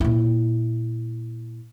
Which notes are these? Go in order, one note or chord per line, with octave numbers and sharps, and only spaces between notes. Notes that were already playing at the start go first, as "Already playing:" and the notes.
A#2 E4